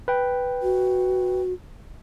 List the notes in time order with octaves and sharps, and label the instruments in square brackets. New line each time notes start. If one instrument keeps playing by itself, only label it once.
[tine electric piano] B4 G5
[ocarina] F#4